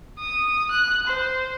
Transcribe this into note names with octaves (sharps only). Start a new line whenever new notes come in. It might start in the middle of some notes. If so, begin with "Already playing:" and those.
D#6
F#6
C5